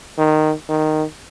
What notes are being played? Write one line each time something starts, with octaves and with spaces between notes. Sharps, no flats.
D#3
D#3